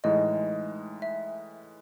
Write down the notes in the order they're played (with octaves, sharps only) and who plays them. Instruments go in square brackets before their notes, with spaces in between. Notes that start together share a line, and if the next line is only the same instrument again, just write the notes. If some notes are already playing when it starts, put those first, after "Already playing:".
[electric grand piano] A2 E3 G#3 D#4 [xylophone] D#5
[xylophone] E5